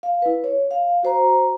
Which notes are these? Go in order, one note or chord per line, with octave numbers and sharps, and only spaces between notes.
F5
E4 B4
C#5
F5
F#4 C5 A#5